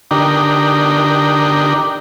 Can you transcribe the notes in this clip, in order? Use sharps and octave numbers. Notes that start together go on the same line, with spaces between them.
D3 D4 D#4 G4 A#4